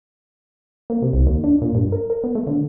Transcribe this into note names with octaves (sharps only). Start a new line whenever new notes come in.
A#3
C3
C2
D#2
D4
A#2
G2
A#4
A#4
B3
A3
D3